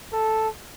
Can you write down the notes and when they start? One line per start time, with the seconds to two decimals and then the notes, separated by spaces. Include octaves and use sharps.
0.13 A4